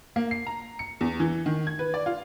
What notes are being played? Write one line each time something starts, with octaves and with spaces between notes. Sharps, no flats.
A#3
C7
A#5
C#7
E2
E3
D#3
G#6
B4
D5
F4